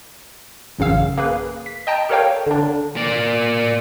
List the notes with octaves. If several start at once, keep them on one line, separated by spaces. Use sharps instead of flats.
A1 F#2 C#3 F5 E6
A#3 G#4 B4
B6
D#5 G5 A5 A#5
G4 A4 A#4 C#5 F5 G5
D3 D4
A#3 D5